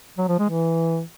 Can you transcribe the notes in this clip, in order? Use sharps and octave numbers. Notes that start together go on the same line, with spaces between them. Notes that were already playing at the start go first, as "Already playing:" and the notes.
F#3
F3
G#3
E3